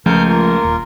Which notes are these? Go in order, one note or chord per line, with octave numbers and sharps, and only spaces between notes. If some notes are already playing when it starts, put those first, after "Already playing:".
C#2 F3 A3 A#4 F6 G6
A#3 F4 A#4
D#1